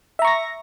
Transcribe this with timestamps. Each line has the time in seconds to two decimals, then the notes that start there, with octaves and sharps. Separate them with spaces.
0.19 E5
0.22 A#5
0.25 C#6
0.27 A#6